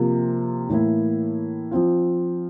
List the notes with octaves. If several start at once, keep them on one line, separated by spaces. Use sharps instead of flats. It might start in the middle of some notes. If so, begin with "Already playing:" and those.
Already playing: C3 F3 A#3 F4
A2 E3 A#3 E4
F3 C4 F4